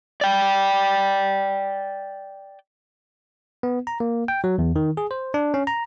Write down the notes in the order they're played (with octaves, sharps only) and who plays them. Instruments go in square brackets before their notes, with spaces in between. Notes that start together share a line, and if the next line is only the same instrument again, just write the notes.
[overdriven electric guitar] D5 G5
[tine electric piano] B3
A#5
A#3
G5
F#3
E2
D#3
G#4
C5
D4
C#4
A#5